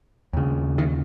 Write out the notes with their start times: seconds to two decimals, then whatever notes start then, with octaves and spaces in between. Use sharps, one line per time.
0.33 D#2 C#3
0.78 D#3